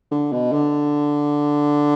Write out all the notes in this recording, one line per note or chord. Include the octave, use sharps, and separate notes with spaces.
D3
B2
D3